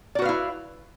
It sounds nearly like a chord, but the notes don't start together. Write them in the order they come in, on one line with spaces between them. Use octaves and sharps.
D5 F#4 B4 F5 E4